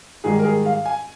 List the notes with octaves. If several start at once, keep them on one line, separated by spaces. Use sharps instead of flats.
G#2 D#3 G3 G#4
A#4
G#4
F5
G#5